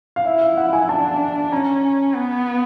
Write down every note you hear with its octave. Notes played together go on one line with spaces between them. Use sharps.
F5
E4 E5
F5
F#5
G#5
D4 A5
C#4 A#5
B3